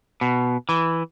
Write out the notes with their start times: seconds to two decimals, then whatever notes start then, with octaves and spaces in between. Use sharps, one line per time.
0.21 B2
0.69 E3